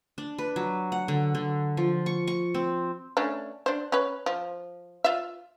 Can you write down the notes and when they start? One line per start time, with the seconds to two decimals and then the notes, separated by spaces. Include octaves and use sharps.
0.18 D4
0.38 B4
0.56 F#3
0.92 F#5
1.08 D3
1.35 D3
1.77 F3
2.06 C#6
2.27 C#6
2.54 C4
3.17 A3 C#4 D4
3.66 D4 C5
3.92 C#4 B4
4.26 F3
5.04 F4 E5